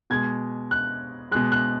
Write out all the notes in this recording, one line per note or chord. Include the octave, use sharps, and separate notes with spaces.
B2 G#3 G#6
F#6
B2 G#3 F#6
F#6